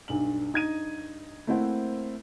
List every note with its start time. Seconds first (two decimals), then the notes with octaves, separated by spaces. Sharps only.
0.08 B1 G2 F#7
0.52 G2 D#4 G#6 D#7
1.47 A3 A#3 C4 E4 C5 F#5